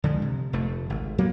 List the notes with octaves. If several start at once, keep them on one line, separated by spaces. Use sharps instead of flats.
D3 F3 G#3
C3
F1 A3
G#1
F#3 A#3 B3